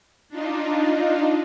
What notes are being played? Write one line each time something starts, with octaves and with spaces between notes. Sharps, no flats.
D4 D#4 F4